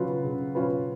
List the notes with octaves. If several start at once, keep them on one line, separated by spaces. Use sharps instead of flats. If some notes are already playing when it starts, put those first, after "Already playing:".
Already playing: C#3 F#3 C#4 F4 B4
C#3
F#3 C#4 F4 B4